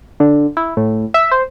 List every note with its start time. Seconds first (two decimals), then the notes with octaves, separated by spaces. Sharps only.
0.20 D3
0.57 E4
0.77 A2
1.14 E5
1.31 C5